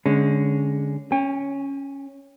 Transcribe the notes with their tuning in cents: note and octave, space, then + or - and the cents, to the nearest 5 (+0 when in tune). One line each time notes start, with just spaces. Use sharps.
D3 -15 G#3 +0 C#4 +0
C#4 +0 G5 +45